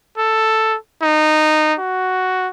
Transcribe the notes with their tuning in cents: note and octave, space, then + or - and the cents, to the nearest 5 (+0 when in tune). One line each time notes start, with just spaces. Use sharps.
A4 +5
D#4 -15
F#4 +5